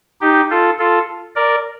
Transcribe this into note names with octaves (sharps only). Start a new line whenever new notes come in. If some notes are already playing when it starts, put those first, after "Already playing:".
D#4 G4
F4 A4
F4 A4
A#4 D5